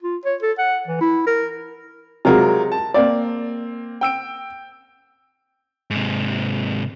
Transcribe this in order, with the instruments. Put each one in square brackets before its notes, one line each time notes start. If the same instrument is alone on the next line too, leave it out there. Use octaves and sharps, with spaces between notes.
[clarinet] F4
C#5
A4
F#5
E3
E4
A#4
[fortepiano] C3 F#3 G#3 [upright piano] F4 G4 A#4
[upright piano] A5
[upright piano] A#3 C4 [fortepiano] D5
[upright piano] G5 E6 D7
[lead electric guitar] G#2 C3